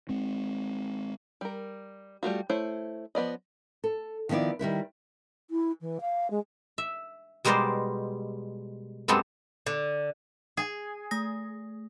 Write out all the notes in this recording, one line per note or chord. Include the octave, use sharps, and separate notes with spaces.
G#3 C4
G3 A#4
G3 A3 F4 F#4
A3 E4 C5 C#5
F3 B3 D5 D#5
A4
D#3 F3 B3 E4 D5
D#3 G3 E4 B4
E4
E3
F5
G#3
E5
B2 G3 G#3 A#4 C5 D5
F#2 G3 G#3 B3 C4 A4
D3
G#4
A3 D#6 A#6